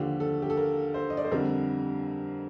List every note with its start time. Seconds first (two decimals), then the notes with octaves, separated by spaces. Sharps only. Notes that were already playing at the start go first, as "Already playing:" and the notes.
Already playing: D#2 D3 F3 G4
0.20 A4
0.42 G4
0.50 A4
0.57 A#4
0.94 C5
1.10 D#5
1.17 D5
1.24 C5
1.32 F2 D3 G3 A#4